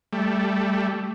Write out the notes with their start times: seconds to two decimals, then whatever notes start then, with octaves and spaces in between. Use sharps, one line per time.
0.13 G3 A3